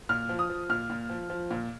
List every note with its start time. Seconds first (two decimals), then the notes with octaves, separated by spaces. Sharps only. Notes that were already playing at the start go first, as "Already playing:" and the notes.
0.09 A#2 F6
0.29 F3
0.39 D#6
0.50 F3
0.69 A#2 F6
0.90 A#2
1.09 F3
1.30 F3
1.51 A#2